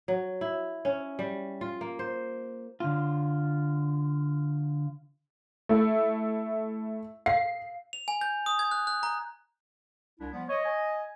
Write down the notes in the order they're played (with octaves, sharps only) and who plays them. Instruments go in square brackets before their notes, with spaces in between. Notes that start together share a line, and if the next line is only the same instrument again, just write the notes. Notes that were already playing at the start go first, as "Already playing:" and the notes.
[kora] F#3
E4
C#4
G3
F4
A#3
C5
[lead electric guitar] D3 F4
[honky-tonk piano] A3 E4
[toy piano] F5 [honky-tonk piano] C7
[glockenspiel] F7
G#5
G6
D#6
G#6
F#6
F#6
A#5
[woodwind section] C2 D4 E4
F3 G3 B3
[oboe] C#5 [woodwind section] D#5
[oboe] G#5